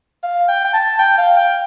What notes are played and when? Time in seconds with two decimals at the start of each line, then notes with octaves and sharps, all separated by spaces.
0.23 F5
0.48 G5
0.65 G5
0.73 A5
0.99 G5
1.18 F5
1.37 G5